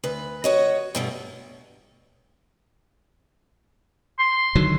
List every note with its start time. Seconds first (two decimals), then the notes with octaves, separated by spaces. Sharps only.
0.04 D2 B4
0.44 F#4 C#5 D#5
0.95 G2 B2 A3
4.19 C6
4.55 D3 D#3 F#3